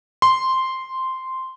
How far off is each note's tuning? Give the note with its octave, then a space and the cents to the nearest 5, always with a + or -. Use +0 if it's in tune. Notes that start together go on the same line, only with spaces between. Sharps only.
C6 -5